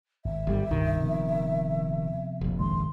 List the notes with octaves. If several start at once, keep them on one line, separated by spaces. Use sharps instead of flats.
G#1 E5
G1 G3
D#1 C2 G2 A#2 D#3
C3 F3 B3
F1 A#1
G2 D#3 G#3 C6